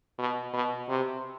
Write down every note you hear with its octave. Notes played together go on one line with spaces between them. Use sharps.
B2
B2
C3